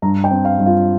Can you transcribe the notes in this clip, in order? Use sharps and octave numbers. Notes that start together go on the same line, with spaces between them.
G2 A#5
G5
C4
F5
G2
F4